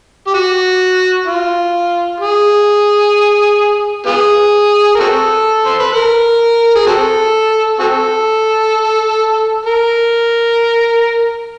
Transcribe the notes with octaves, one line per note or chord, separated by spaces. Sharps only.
G4
F#4
F4
G#4
B3 F4 G#4
A#4
C4 F#4 A4
C5
B4
A#4
G#4
C4 F#4 A4
C4 F#4 A4
A#4